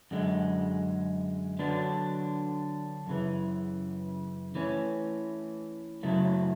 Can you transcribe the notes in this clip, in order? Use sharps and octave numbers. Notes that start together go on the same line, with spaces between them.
F#2 D3 G#3
D3 F#3 B3 D4
F#2 C#3 E3
E3 A3 C#4
F#2 C#3 F#3 A3 E4